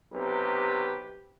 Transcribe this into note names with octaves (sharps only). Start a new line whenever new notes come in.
B1 C3 G4 B4